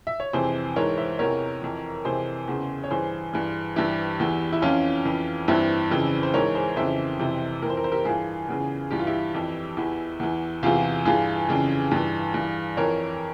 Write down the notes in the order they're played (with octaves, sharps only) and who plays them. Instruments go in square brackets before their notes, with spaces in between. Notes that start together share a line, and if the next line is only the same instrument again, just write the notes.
[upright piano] E5
C#5
F2 C3 E3 G#4 C5
G#2 E3 A#4 C#5
C5 E5
E2 C3 E3 A#4 C#5
F2 E3
F2 C3 E3 G#4 C5
E2 C#3 E3
C#5
G2 E3 G#4 C5
G2 E3
G2 E3 E4 G4
E2 E3
E4
F2 E3 C#4 F4
F2 E3
G2 E3 C4 E4
F2 C#3 E3
C5
G#2 E3 A#4 C#5
G#4 C5
F2 C#3 E3 C5 E5
F2 C3 E3
E3 A#4
F2 C5
A#4
C5
G4 A#4
G2 E3 F4 G#4
E2 C#3 E3
G2 E3 G4
F4
E4 G4
F2 E3
E2 E3
E2 E3
E2 C3 E3 F4 G#4
G2 E3 F4 G#4
F2 C#3 E3
G2 E3
G2 E3
F2 E3 A#4 C#5